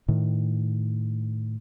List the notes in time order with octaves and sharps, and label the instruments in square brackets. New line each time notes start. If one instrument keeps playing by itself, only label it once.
[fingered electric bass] A2 D#3